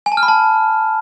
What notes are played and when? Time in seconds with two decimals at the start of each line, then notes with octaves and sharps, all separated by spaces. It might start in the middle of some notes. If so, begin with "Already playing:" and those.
0.06 G#5
0.12 A5
0.17 F6
0.23 B5
0.28 A5